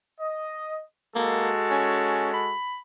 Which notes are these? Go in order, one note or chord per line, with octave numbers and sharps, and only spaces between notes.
D#5
G#3 A#3 F#4 A4
C#4
B5